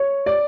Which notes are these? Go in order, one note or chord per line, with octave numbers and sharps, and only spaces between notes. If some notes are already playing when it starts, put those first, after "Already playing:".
Already playing: C#5
D5